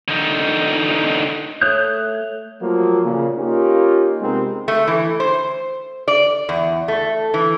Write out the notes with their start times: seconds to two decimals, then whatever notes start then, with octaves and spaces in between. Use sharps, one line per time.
0.08 D3 D#4
1.62 A3 C#5 D#6 F#6 G6
2.61 F3 F#3 A3 A#3 F4
3.04 A#2 C#3
3.37 A#3 C#4 D#4 F4 G4
4.21 C3 G#3 B3 C4 D#4 A#4
4.68 A3
4.87 E3
5.20 C5
6.08 D5
6.49 E2
6.88 A3
7.34 E3